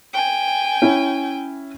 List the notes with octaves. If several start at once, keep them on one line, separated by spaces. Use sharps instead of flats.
G5 G#5
C#4 E4